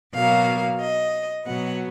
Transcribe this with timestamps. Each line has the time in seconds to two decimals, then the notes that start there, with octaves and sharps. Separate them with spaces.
0.13 B2 F#3 A#3 F5
0.81 D#5
1.46 B2 F#3 B3 F#5